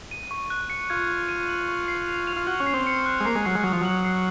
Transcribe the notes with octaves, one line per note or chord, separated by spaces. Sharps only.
D#7
C#6
F#6
C#7
F4 G#6
G#6
D#7
F#7
C#6
C7
F7
F7
F4
F#4 F6
C#4
C7
C4
C#7
F#6
G#3
A#3 C7
G#3
F#3 C7
G#3
F#3 D#6
F3
F#3 F#7
C7